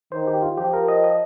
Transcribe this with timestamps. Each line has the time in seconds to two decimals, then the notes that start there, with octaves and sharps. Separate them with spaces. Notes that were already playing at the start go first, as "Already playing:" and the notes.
0.12 D#3 C5
0.27 G4
0.42 F4
0.57 F3 G4
0.73 A#4
0.88 D#5
1.04 D#5